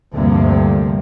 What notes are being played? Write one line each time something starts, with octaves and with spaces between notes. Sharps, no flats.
D2 G2 C3 F3 A#3